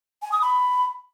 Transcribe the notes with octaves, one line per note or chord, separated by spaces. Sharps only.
G#5
D#6
B5